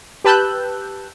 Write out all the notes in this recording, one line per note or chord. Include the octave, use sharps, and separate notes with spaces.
G4 B4 A5 E6 F#6 G6